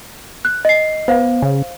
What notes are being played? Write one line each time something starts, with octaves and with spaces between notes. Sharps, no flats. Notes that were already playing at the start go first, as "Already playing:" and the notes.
F#6
D#5 C7
B3 C5 F5
C#3